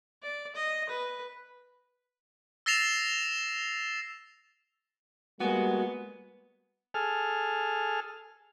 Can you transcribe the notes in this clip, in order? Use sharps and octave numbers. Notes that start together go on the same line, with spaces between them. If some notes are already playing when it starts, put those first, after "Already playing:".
D5
D#5
B4
E6 A6 A#6 C7 E7 F7
G3 G#3 A#3 B3 F#4
G#4 A4 F6